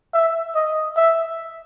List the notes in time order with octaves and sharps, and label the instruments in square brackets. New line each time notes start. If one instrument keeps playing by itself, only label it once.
[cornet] E5
D#5
E5